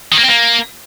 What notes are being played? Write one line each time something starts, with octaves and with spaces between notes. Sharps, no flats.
D#3
A#3
C4
A#3